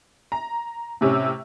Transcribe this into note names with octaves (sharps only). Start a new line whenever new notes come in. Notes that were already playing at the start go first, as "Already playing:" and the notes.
A#5
A2 C3 C#4